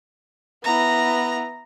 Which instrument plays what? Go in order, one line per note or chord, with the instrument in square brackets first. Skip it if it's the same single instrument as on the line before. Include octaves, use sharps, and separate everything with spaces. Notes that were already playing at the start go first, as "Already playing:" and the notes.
[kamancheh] B3 E4 [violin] A#5